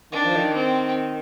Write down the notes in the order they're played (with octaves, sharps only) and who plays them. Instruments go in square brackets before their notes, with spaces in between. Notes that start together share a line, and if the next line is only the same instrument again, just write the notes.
[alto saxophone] D#3 [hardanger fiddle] D4
[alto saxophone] F3
D#3
[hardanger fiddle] C4